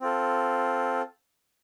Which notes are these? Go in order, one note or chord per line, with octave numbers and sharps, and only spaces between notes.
C4 F4 A4